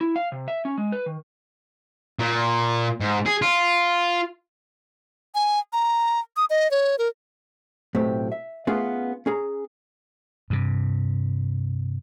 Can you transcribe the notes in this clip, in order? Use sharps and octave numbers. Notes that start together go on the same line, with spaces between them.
E4
F5
C3
E5
C#4
G#3
B4
D#3
A#2
G#2
G#4
F4
G#5
A#5
D#6
D#5
C#5
A#4
B1 A2 A3 C4 G4
E5
A3 B3 C#4 F4 G#4 B4
C#4 G#4 A#5
G2 C3